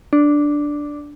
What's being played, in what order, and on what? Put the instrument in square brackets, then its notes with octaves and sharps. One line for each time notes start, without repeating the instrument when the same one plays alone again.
[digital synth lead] D4